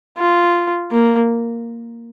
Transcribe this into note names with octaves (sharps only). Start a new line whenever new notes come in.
F4
A#3